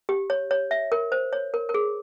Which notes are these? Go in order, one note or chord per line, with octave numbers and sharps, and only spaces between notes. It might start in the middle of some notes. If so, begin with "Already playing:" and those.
G4
C#5
C#5
E5
A#4
C5
C#5
A#4
A#4
G#4